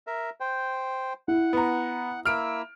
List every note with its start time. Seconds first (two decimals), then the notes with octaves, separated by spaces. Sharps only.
0.07 A#4 E5
0.40 C5 G5
1.28 E4 F#5
1.53 B3 A#5
2.26 A#3 E4 E6 F6 D7